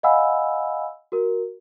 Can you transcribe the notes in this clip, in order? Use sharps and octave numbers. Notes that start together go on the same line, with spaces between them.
D#5 F5 F#5 G#5 B5 E6
F#4 A#4